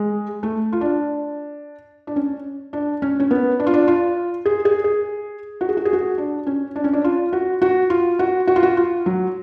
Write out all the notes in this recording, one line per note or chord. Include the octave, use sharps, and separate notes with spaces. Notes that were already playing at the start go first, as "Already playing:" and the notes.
Already playing: G#3
A3
F4
D4
D4
C#4
D4
C#4
C#4
B3
D4
F4
D4
F4
G#4
G#4
G#4
F#4
G#4
F#4
G#4
F#4
D4
C#4
D4
C#4
D4
F4
F#4
F#4
F4
F#4
F#4
F4
F#4
F4
F#3